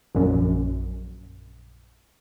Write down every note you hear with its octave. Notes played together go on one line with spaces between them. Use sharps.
A#1 F#2